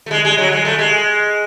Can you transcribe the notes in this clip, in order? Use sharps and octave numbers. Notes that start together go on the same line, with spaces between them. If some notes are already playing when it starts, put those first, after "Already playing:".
A3
G#3
G#3
F#3
G#3
A3
G#3